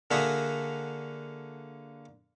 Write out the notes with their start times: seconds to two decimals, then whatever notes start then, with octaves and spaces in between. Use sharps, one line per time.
0.11 D3 A#3 F#4 G#4 E5 A#5